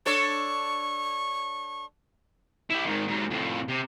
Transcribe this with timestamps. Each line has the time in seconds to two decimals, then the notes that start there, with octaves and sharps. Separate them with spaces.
0.06 D4 A4 C#5 C#6
2.70 E4 G4
2.85 G#2 D#3
3.08 G#2 F#3
3.31 F2 A2
3.68 C3